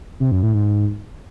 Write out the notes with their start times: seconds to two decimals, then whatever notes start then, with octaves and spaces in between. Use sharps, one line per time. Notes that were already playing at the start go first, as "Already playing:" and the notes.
0.20 C3
0.31 F#2
0.43 A2
0.54 G#2